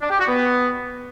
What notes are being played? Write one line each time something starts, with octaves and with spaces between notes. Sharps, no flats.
D4
G4
F#4
B3